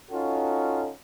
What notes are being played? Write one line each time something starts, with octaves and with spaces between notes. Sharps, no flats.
C#4 D#4 F4 F#4 A4